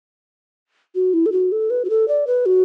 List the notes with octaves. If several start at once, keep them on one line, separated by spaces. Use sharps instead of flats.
F#4
E4
A4
F#4
A4
B4
F#4
A4
D5
B4
F#4